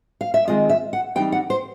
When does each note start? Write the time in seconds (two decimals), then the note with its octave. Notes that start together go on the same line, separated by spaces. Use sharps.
0.21 F5
0.34 E5
0.47 D#3 G#3 C4 F4 D#5
0.69 E5
0.93 F#5
1.15 E3 G3 C4 D#4 G5
1.32 F#5
1.50 C5